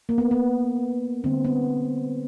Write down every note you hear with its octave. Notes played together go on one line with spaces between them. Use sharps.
A#3
B3
B3
D3 G3 A#3 C4
B3